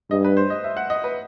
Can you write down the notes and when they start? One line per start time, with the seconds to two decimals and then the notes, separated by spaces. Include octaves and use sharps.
0.11 G2 D#5
0.24 B4
0.37 C5
0.50 D#5
0.64 E5
0.77 F#5
0.90 D#5
1.04 B4